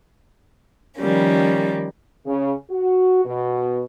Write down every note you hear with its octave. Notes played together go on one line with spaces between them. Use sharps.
D#3 F3 G3 A#3 C#4
C#3
F#4
B2